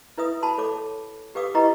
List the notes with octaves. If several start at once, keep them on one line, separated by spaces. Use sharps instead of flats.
E4 B4 E5 D#6
F#4 A5 B5 C6
A4 C#5 D6
G4 B4 F5 D6 D#6
E4 G4 B4 D#5 A#5 C#6